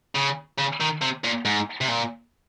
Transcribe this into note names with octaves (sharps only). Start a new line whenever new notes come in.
C#3
C#3
D#3
C3
A#2
G#2
C3
A#2